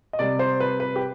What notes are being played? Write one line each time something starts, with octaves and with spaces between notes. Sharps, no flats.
D#5
C3 G3 D5
C5
B4
B4
G4